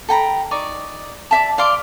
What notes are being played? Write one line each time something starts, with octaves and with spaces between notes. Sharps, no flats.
A4 G5 A#5 B5
D#4 D5 C#6
D5 E5 A5
D5 F5 C6 D6